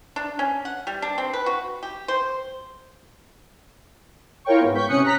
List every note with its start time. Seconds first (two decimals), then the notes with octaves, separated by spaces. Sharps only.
0.16 D4
0.39 C#4
0.65 F#5
0.87 G3
1.02 D4
1.18 C4
1.33 B4
1.46 F#4
1.83 G4
2.08 C5
4.45 E4 F4 A#4 C#5 G5 C#6
4.60 G#2 B3
4.74 C#6 G6 B6
4.88 C3 C#4 D#6 F#6 C#7
5.03 A#5 F#6 A#6 B6